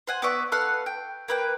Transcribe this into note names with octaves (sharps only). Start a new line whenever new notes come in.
C5 F#5 G#5
B3 D5 E5 C#6
A4 B4 F5 F#5
G5
A#3 B4 G5